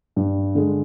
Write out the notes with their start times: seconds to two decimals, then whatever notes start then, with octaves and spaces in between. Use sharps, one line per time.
0.16 G2
0.55 D3 G#3